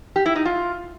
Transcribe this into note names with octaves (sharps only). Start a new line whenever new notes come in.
G4
E4
D#4
F4